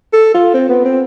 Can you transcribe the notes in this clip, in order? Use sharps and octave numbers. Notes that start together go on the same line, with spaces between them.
A4
F4
C4
B3
C4